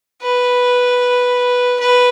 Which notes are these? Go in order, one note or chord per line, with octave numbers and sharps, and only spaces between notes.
B4
B4